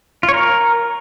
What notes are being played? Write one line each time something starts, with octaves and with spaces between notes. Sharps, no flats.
F4
C#5
A#4